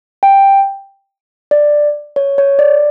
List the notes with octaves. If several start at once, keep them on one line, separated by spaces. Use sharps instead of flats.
G5
D5
C#5
C#5
D5